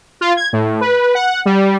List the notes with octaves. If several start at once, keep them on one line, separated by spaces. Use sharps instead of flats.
F4
G#6
A2
B4
F#5
G3